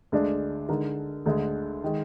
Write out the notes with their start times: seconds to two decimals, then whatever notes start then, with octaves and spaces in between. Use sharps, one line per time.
0.12 D2 D3 G#3 D4
0.69 D3 G#3 D#4 A#4
1.26 D2 D3 G#3
1.84 D#3 G#3